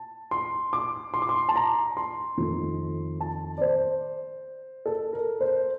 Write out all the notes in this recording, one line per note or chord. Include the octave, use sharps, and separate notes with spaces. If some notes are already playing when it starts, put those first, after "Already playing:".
Already playing: A5
C6
D6
C6
D6
C6
A5
A#5
C6
F2 D#3 A3
A5
D5
C5
A4
A#4
C5